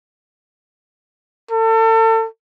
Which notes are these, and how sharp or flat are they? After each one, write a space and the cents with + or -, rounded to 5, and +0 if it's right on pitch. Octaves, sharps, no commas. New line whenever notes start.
A4 +35